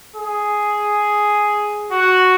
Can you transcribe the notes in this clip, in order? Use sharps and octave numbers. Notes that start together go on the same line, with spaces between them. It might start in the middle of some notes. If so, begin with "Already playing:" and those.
G#4
F#4